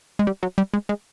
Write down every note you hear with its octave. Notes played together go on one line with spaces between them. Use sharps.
G#3
G3
F#3
G3
G#3
G#3